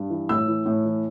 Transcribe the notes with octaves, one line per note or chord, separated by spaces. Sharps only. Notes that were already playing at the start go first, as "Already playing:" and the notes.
Already playing: G2
E3
A2 E6
E3
A2
E3